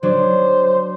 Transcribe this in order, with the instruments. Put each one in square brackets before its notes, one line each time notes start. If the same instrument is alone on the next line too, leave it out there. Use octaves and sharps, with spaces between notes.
[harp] F#3 D4 [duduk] C5